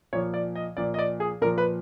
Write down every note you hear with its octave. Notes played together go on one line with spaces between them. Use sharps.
A#2 F3 C#5
D5
D#5
A#2 F3 D5
D#5
D5
G#4
A#2 F3 A#4
B4